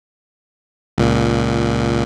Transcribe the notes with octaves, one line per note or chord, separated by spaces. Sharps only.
C#2 A#2